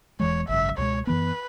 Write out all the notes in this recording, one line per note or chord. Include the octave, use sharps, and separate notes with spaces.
E1 E2 E3 G#3 C#5
G#1 F#2 C#3 E5
C#2 B2 G#3 C#5
F#2 E3 B3 B4